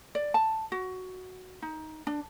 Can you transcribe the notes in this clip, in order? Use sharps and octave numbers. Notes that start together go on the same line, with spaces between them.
D5
A5
F#4
D#4
D4